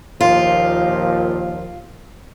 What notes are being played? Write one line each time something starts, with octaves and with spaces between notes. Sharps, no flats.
D#2 A#2 F3 F4